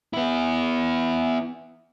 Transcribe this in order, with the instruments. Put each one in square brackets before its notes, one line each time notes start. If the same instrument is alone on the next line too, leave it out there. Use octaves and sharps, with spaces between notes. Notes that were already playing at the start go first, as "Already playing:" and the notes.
[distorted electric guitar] B3 E4